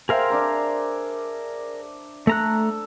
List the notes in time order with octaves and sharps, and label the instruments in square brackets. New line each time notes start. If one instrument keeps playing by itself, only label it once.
[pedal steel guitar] G#4 A#4 F5 [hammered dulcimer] C5 E5 G5
[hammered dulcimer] D4 D5 A#5
[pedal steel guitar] A3 A#5 F#6 [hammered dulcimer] A4